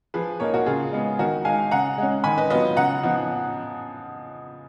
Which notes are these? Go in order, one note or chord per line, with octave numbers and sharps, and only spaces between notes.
F3 G#4 B4
A#3 D#4 A#4 C#5
F#4 A#4
C#3 F4 G#4
G#3 B3
D#3 F#4 A#4
G#3 D#4 F5 G#5
C#3 F#5 A#5
G#3 C#4
D#3 G#5 B5
B4 D#5
F#3 B3 F4 B4 D#5
C#3 F#5 A#5
F3 B3 D#4